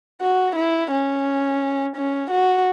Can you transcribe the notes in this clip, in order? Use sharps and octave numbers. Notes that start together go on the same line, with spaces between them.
F#4
E4
C#4
C#4
F#4